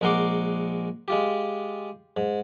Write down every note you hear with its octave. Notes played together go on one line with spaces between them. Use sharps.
A#1 G#3 A#4 F#5 C6 D6
G#3 F4 G4
G#2